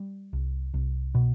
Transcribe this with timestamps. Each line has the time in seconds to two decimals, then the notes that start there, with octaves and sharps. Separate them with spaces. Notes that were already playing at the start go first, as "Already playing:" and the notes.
Already playing: G3
0.33 C2
0.74 C2
1.15 B2